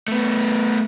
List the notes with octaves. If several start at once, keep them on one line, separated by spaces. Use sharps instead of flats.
A3 B3